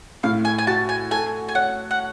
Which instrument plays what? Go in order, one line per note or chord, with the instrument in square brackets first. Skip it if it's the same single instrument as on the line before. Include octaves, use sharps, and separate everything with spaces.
[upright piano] A2 [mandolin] F5
[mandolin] G#5
G#5
[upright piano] F#4 [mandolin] A5
[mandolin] G#5
[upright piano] A4 [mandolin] G#5
[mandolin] G#5
[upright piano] C#5 [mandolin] F#5
[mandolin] F#5